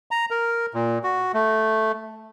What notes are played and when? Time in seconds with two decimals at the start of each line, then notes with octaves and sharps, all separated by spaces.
0.11 A#5
0.31 A#4
0.74 A#2
1.04 F#4
1.34 A3